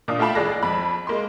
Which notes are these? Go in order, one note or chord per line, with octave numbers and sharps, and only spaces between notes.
A#2 D4 F4 D#6
A3 F4 G5 A5 B5
A1 G#4 D5 F#6 A#6
F2 B5
G#3 A#3 C6